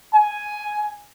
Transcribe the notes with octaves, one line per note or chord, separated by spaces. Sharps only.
G#5